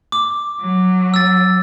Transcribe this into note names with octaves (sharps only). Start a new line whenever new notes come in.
D6
F#3
E6 A6